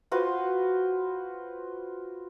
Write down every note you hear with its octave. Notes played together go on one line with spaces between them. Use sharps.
F4 F#4 B4 C5